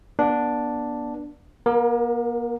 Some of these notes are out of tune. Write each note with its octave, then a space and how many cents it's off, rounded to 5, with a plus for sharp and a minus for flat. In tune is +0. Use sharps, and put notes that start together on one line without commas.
B3 -40 D4 +0
A#3 +45 A#4 +0